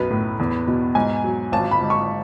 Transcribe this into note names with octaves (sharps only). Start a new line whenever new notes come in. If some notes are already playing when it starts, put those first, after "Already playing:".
Already playing: B1 F#2 B4
A2
E2
B2
G#2 G#5
F#3
G#1 A5
B5
G#2
C#6